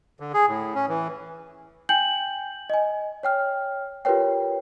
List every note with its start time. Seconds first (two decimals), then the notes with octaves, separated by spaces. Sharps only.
0.20 D3
0.34 G#4
0.48 A2
0.75 C#4
0.89 E3
1.89 G5 G#5 G6 F#7
2.70 D#5 G#5
3.23 C#5 G5 F6
4.05 F4 G4 A#4 B4 C#5 G5